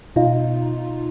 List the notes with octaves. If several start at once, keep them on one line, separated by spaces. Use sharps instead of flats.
B2 D#4 F4